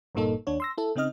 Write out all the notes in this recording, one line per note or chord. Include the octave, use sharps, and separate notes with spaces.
G1 G2 A#2 A#3 D#4 A4
D#2 D4 C#5
C6 E6 A#6
E4 A4
C#3 C4 D#4 D#5 F6